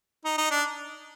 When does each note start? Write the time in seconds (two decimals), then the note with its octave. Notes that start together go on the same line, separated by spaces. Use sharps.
0.25 D#4
0.38 D#4
0.51 D4